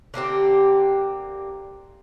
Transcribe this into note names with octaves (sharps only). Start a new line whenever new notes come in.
D3 A#3 C4 G4